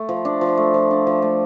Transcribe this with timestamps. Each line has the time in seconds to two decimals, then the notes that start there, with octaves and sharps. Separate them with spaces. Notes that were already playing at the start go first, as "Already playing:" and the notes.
Already playing: A3
0.09 F3
0.25 D4
0.41 F3
0.57 A3
0.74 F3
0.91 D4
1.07 F3
1.22 A3